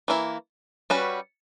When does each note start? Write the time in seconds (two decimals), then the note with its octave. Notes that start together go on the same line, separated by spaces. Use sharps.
0.08 E3 A#3 E4
0.90 G3 C#4 F#4 B4